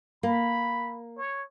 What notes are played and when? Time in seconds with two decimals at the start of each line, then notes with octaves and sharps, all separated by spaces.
0.23 A#3 B5
1.17 C#5